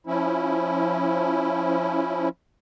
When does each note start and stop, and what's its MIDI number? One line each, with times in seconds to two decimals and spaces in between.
0.07 2.29 53
0.07 2.29 61
0.07 2.29 64